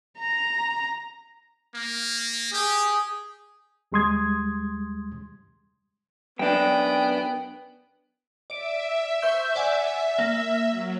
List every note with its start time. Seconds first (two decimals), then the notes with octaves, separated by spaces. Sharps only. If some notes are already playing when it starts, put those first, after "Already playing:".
0.19 A#5
1.75 A#3
2.53 G4 G#4
3.92 D#2 G3 G#3 C6 D#6 G#6
6.39 F#2 B3 D4 G5
8.50 D5 E5 D7
9.22 C5 C#6 G6
9.56 D5 F#5 G#5
10.18 A#3
10.69 F#3